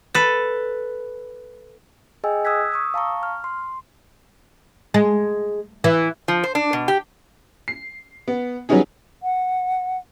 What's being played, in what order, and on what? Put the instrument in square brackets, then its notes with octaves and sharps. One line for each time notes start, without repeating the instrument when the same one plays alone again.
[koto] A4 B4
[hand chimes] G#4 D#5 G5 G#5 E6
D#6 E6 F#6 G#6 B6
C#6 D#6 E6
F5 A5 A#5 C#6
F6
C6
[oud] G#3
E3
[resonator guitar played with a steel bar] F3
C5
D4
B2
G4
[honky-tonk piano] C7
B3
F#3 G3 B3 C#4 D#4 G#4
[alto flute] F#5